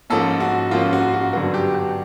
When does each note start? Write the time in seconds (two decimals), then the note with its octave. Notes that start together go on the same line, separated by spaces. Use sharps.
0.10 G#2 F3 A#3 C#4 A4
0.40 F#4
0.71 G#2 F3 A#3 C#4 F4
0.93 F#4
1.14 F#4
1.33 G2 D3 F#3 B3 F#4
1.54 G4
1.74 G4